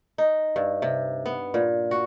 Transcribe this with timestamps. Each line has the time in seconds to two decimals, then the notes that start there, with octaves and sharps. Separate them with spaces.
0.18 D#4
0.56 G2
0.82 C3
1.26 B3
1.54 A#2
1.91 F#4